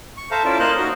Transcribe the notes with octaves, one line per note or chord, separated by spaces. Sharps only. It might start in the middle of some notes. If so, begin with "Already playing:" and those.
C#6
A4 C5 E5 F5 A5 A#5
C#4 E4 F4 A4 D5
A#3 C5 D#5 F5 F#6
D#4 F#4